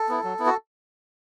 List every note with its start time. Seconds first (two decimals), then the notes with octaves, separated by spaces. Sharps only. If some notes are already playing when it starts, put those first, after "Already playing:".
Already playing: A4
0.09 B3 E4
0.24 F#3
0.39 B3 E4
0.46 F#4